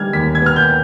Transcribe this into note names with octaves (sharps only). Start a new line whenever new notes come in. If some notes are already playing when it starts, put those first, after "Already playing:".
Already playing: D3 G3 B3 F6 G#6
D#2 B6
G#6
B3 F6
G6